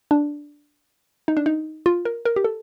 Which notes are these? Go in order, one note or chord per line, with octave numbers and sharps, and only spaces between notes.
D4
D#4
D4
D#4
F4
A#4
A#4
G4
A4